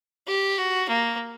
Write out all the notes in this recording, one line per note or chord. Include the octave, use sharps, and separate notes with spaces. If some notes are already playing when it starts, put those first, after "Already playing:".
G4
F#4
A#3